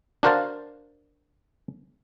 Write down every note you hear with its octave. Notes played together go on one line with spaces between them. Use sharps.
D4 F#4 A#4 C5 F5 A5